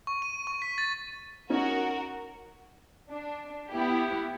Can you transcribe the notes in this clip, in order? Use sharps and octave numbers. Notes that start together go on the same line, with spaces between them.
C#6
D#7
C#6
B6
A6
C#4 D#4 F#4 A#4
D4
B3 E4 G4